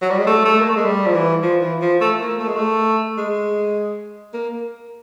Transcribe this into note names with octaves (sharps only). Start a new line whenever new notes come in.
F#3
G3
G#3
A3
A3
A#3
A3
G#3
G3
F3
E3
F3
E3
F3
A3
A#3
A3
G#3
A3
G#3
A#3